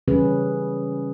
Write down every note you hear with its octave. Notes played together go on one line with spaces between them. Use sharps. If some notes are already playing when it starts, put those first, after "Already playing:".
C#3 E3 G3 C#4 G#4 B4